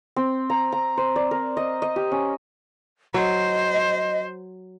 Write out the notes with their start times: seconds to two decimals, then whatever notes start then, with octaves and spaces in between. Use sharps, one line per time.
0.16 C4
0.50 A#5
0.72 A#5
0.97 C5
1.16 D5
1.31 A#4
1.57 D#5
1.82 D#5
1.96 G4
2.12 C#4
3.14 F#3 C5 D#5